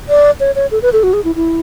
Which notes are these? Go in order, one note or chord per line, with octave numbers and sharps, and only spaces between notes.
D5
C#5
C#5
A4
B4
A4
F#4
G#4
E4
E4